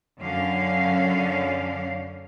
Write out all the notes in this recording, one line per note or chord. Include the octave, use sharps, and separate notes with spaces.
F#2 D3 C#4 F5